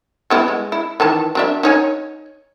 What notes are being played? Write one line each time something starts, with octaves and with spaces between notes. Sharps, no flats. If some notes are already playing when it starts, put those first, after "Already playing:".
G3 B3 E4
G#3
E4
D#3 E3 A5
F#3 D4 E5
D#4 C#5 G#5